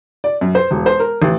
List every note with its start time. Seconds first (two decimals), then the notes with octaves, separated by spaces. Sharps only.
0.24 D5
0.41 F#2
0.55 C5
0.71 E1
0.86 C5
1.00 A#4
1.22 A1